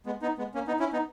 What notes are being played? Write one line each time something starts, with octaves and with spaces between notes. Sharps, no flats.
G#3 B3
B3 D#4
G#3 B3
A#3 C#4
B3 D#4
C#4 E4
B3 D#4